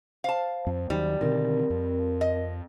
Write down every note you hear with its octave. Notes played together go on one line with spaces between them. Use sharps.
C5 F5 A5
F2
D#2 D#3 F#3 G3
B2 D3 D#3 C4 A#4
F2
D#5